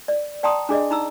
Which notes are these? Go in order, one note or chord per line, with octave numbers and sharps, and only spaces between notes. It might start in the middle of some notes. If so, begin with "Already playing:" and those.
D5
D5 G5 A5 A#5 C6 D#6
D4 G#4 D5 D#5
D#4 A#5 E6